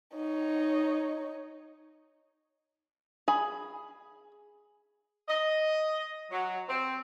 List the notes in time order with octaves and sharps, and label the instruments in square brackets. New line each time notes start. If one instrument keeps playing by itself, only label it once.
[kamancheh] D#4 C#5
[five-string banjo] G#4 B5
[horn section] D#5
F#3
C4